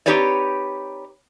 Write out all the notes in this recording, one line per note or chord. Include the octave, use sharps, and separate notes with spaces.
C4 D#4 G4 B4 C#5 D5